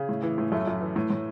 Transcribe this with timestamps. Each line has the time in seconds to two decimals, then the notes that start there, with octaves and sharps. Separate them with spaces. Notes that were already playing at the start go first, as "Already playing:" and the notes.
Already playing: C#3 G#4
0.09 A2
0.23 E3
0.38 A2
0.52 F#2 A3
0.67 F#2
0.81 E3
0.96 A2
1.10 A2